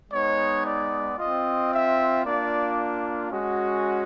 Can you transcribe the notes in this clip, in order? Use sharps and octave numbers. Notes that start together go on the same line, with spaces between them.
G#3 B3 D#4 C#5
D5
C4 F4 D#5
E5
A#3 D4 F4 D5
G#3 C#4 F#4